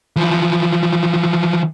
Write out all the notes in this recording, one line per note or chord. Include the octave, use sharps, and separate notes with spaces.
E3 F3